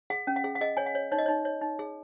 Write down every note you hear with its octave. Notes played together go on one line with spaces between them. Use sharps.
G#4 F#5
C#4
F#5
G#4
F#5
G#4 D#5
C#5 G#5
F#5
C#5
D#4 C#5
D#5
D#4 C#5
C#5
D#4
G#4